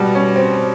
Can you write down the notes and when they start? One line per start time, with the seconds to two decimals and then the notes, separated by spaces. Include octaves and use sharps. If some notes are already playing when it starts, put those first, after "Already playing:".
Already playing: B2 G3
0.15 C#4
0.36 C4